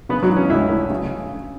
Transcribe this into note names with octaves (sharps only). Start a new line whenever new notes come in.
C#3 B3 B4
F#3 F#4
E3
C#4
C#2 E4 E5
A3
C#3